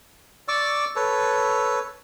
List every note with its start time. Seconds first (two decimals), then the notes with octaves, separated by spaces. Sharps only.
0.48 D5 C#6 D6 E6
0.96 A4 B4 C#5